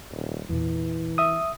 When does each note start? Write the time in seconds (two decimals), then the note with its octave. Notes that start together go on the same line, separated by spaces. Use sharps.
0.11 D#1 G3
0.49 E2 A#2 E3
1.18 E5 D#6